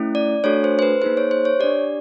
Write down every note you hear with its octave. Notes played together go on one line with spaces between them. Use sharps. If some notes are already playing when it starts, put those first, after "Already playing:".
Already playing: A3 C#4 E4
D5
A3 D4 F#4 A4 C#5
C5
C5
B4
A#3 D#4 G#4 C5
C#5
C5
C#5
D4 G4 D5